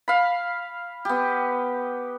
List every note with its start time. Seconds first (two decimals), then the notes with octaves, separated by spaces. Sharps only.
0.08 F5 B5
1.05 B3 G4